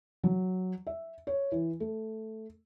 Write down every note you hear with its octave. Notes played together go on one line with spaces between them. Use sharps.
F#3
E5
C#5
E3
A3